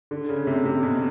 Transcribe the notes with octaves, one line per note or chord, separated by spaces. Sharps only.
D3
C#3
C3
C3
B2